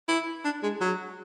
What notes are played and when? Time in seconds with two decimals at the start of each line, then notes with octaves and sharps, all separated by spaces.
0.08 E4
0.45 D4
0.63 G#3
0.81 F#3